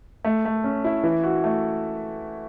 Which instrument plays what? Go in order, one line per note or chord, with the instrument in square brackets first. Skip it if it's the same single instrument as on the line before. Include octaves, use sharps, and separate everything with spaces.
[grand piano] A3
A3
C#4
E4
E3
F#4
A3